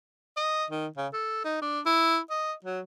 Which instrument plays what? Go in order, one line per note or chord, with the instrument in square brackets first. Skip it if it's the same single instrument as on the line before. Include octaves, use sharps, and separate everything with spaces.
[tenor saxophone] D#5
D#3
C#3
A4
D#4
D4
E4
D#5
F#3